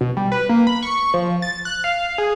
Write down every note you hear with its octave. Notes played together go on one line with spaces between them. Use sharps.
B2
G3
B4
A#3
B5
C#6
F3
A6
F#6
F5
G#4